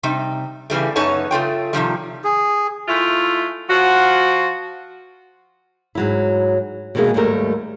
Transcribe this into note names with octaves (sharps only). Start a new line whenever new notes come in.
C3 G3 D#4
C#3 E3 G3 A3
F#2 B3 C#4 D#4 C#5 A5
C#3 A3 F4 G5
C3 D#3 F3 G3
G#4
G#3 A3 E4 F4
F3 F4 F#4
G#2 F#3 E4
B2 D#3 E3 F#3 G#3 A#3
D#2 G#2 G3 A3 A#4